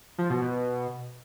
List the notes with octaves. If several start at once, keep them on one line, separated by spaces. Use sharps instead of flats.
F3
B2
B2